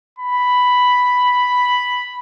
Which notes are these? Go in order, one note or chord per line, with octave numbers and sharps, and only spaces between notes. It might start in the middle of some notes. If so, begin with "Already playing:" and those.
B5